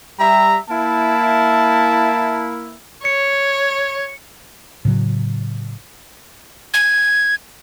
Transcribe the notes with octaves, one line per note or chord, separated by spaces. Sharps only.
G3 E5 A#5
A#3 E4 A5
C#5 C#7
A2 C#3 F#3
G#6